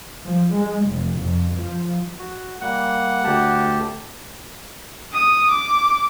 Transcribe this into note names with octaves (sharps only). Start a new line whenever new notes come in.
F3
G#3
F1
F2
F3
F#4
G3 A#3 F#5
D2 G4 A5
D#6
D6